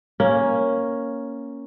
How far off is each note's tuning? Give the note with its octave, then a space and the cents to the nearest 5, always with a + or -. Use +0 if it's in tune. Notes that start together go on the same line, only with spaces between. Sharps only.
A#3 +0 C#4 +0